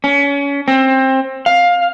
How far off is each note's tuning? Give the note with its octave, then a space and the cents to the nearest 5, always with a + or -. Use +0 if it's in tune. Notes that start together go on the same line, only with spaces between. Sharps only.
C#4 +30
C4 +20
F5 +15